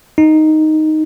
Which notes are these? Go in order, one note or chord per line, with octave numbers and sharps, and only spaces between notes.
D#4